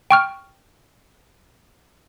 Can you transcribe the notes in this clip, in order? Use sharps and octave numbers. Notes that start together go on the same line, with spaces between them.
G5 C#6 F6